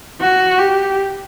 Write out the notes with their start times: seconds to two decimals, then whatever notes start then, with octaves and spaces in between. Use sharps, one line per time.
0.21 F#4
0.59 G4